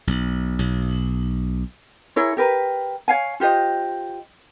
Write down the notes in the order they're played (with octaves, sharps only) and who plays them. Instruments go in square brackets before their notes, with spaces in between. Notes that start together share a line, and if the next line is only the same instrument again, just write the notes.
[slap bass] B1
B1
[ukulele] E4 G#4 A#4 C#5
G4 A#4 B4
C#5 F5 G#5
F4 G4 C5 D#5